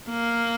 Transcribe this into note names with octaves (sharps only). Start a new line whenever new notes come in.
A#3